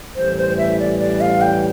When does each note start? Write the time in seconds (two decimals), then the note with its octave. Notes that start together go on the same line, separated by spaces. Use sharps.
0.16 A1 A2 E3 G3 C5
0.38 C5
0.58 E5
0.79 D5
1.00 D5
1.21 F5
1.41 G5